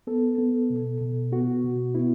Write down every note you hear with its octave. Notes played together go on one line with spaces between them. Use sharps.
B3 A4
B3
B2
B2
B3 F#4
B2
B3 E4